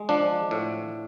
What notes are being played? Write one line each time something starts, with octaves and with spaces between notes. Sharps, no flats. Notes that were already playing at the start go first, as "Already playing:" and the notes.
Already playing: G#3
F3 D4
A2